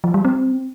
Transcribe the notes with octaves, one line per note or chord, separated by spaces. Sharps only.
F3
G3
C4